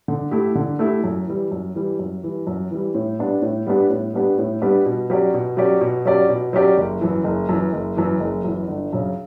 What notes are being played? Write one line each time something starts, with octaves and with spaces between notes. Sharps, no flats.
D3
A3 E4 G4
D3
A3 E4 G4
F#2
E3 G3
F#2
E3 G3
F#2
E3 G3
F#2
E3 G3
A2
G3 B3 D4 G4
A2
G3 B3 D4 G4
A2
G3 B3 D4 G4
A2
G3 B3 D4 G4
B2
F#3 C#4 G4 D5
B2
F#3 C#4 G4 D5
B2
F#3 C#4 G4 D5
B2
F#3 C#4 G4 D5
F#1
F#2 E3
F#1
F#2 E3
F#1
F#2 E3
F#1
F#2 E3
G1
F#2 C#3